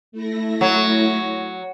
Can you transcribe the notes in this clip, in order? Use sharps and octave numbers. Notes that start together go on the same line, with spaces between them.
A3 E4 A#6
F#3